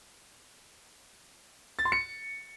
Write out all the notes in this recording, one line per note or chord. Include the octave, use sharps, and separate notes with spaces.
A6
C6
C#7